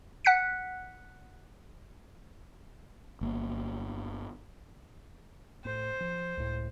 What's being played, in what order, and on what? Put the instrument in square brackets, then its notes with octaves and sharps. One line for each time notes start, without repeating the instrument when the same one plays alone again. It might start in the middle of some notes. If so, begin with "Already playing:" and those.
[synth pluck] F#5 F#6 B6 C#7
[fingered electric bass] G1 A#3
[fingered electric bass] A2 [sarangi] C5
[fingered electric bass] F3
C#2 A2